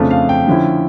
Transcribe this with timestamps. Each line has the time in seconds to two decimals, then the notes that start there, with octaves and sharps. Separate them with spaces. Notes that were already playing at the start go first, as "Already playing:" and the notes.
Already playing: F2 C#3 F3 A3 D4 A5
0.11 F5
0.29 G5
0.48 D3 F3 C#4 E4